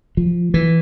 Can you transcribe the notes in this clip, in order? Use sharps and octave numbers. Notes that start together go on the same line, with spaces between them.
F3
E3